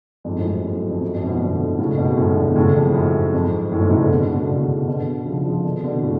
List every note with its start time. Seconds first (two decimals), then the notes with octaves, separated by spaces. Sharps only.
0.24 F2 G#2
0.38 F#2 A2
0.63 F#2
0.76 F#2
0.89 F2
1.02 F#2
1.15 F2 G#2
1.23 B2
1.28 F#2 A2
1.40 B2 D3
1.79 A2 C#3
1.98 G#2 B2
2.17 F#2 A2
2.37 B2 D3
2.56 A2 C#3
2.75 F2
2.89 G#2
2.94 F#2
3.33 F2 G#2
3.72 F#2 A2
3.81 G#2 B2
3.91 A2 C#3
4.01 B2 D3
4.27 A2
4.34 B2
4.42 C#3
4.48 B2 D3
4.87 B2 D3
5.26 C#3 F3
5.45 C#3 F3
5.64 B2 D3
5.84 B2 D3
6.03 A2 C#3